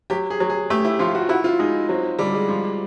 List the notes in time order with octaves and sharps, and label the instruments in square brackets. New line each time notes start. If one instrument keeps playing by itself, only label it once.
[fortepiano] F#3 [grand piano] G4
[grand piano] G#4
[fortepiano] F#3
[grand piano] G#4
[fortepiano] A3 [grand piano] G4
[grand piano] E4
[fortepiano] F3 [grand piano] F4
[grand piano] F#4
[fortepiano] E4 [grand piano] F#4
[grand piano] F4
[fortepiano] G#3 [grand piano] D#4
[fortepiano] F#3 [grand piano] C4
[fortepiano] D3 [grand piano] G3
[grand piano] G#3
[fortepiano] F3